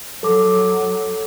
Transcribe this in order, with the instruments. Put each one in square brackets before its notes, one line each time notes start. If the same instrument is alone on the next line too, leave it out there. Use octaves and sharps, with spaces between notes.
[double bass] F#3 [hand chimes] A4 D6